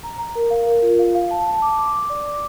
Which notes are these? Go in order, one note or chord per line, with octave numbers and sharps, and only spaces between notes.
A#5
A#5
A#4
F5
A#4
F4
F5
F5
A5
A5
D6
D6
D6
D5
D6